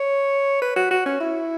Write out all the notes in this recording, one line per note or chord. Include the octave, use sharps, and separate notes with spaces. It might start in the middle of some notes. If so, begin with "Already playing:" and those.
Already playing: C#5
B4
F#4
F#4
C#4
E4